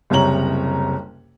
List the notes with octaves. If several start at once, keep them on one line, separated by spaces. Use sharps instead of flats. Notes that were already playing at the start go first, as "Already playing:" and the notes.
F#1 C2 C3 C#5 A#5 F#7